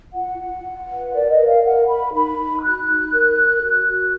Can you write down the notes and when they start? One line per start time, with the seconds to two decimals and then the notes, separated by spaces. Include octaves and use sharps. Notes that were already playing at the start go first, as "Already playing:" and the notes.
0.13 F4 F#5
0.38 F4
0.63 F4
0.88 B4
1.13 A#4 D5
1.29 D#5
1.37 A#4
1.46 F5
1.63 A#4 F#5
1.87 A#4 B5
2.13 D#4 B5
2.37 D#4
2.62 F#4 F#6
2.87 D#4
3.12 A#4
3.38 A#4
3.62 F#4
3.87 F#4